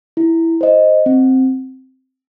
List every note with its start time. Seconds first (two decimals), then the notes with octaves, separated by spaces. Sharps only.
0.17 E4
0.61 C5 D#5
1.06 C4